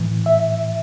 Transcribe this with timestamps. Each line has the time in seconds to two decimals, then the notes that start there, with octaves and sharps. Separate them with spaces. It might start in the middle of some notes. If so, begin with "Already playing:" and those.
Already playing: A2 E3
0.26 E5